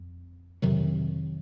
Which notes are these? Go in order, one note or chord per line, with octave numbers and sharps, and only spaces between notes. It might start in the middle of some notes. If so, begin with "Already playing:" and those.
Already playing: F2
F2 C3 D#3 F#3